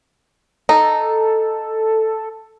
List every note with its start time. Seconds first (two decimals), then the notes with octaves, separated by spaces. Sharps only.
0.69 D#4 A4